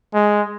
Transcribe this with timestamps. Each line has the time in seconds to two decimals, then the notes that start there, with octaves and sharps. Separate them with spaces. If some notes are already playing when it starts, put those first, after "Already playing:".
0.14 G#3